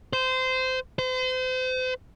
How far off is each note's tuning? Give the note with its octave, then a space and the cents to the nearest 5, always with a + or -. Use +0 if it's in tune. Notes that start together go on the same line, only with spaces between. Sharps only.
C5 -20
C5 -35